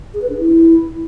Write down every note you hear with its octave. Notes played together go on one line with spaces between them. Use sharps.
G#4
B4
D4
E4